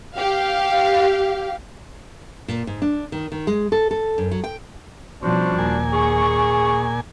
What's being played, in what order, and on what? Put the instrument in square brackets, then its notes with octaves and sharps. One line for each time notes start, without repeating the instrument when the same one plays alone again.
[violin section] G4 F5
[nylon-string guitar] A#2
G#2
D4
D#3
D#3
G#3
A4
A4
F#2
F#3
G5
[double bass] B2 F3 [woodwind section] G3 F#4 C5 [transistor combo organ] C#4 [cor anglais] D4
[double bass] D#2 [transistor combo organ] A#2 G#5
[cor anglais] G#4 [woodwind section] C#6